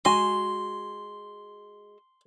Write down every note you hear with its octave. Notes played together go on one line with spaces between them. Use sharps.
G#3 F#4 G#5 C6